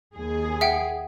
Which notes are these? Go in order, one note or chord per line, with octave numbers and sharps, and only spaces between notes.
D#2 G#4
E5 F#5 G5